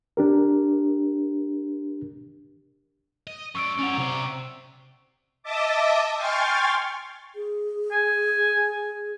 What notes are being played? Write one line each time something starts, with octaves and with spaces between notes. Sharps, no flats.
D4 G4 A#4
D#5
F#2 D5 C#6 E6 D7
C#4 D5 F#5 A#5
C3 C5
D#5 E5 A5 D6
G5 G#5 C6 C#6 F6 A6
G#4
G#5